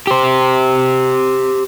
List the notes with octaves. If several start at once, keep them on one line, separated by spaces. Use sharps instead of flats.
G4 C5